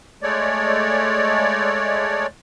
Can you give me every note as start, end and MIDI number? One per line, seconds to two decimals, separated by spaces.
0.23 2.26 56
0.23 2.26 57
0.23 2.26 73
0.23 2.26 74